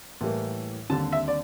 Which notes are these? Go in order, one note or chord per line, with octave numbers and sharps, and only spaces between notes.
A2 E3 G3 A#3
D#2 D3 G3 C4 A5
E5
D5